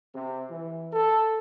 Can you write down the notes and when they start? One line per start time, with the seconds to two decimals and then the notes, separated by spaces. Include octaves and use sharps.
0.15 C3
0.50 E3
0.92 A4